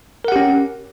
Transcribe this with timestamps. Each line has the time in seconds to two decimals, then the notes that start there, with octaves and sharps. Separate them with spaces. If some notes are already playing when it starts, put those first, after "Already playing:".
0.25 A#4
0.28 F#5
0.32 G4
0.36 C#4